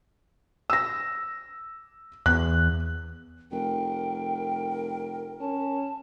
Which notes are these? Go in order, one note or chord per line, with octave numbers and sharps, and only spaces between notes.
E6 A#6
E2 F#6
F1 A#4 G5
C#4 A5